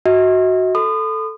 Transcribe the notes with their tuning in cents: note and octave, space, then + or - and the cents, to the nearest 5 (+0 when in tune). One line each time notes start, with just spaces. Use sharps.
F#4 +0 D#5 +45
A4 +0 B5 +45 D#6 -30